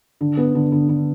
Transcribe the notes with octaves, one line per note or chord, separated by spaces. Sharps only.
D3
B3
D3
D3
D3